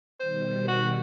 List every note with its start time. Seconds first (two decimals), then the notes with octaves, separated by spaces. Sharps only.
0.20 B2 D#3 G3 C5
0.68 F#4